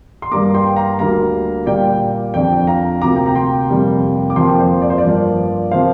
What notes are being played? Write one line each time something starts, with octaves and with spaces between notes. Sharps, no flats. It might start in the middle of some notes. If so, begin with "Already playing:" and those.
C6
G2 G3 A#3 A#5 D6
G5 C6
F5 A#5
D2 D3 G3 A#3 F5 A#5
A#2 G3 A#3 D5 G5
F2 D3 F3 D5 G5
F5 A#5
D2 C3 A#3 A#5 D6
G5
A#5
G5 C6
F2 C3 G3 A#3
D6
F2 F3 A#3 G5 C6
C5
D5
C5
D5
G2 F3 A#3
C3 F3 A#3 C5 F5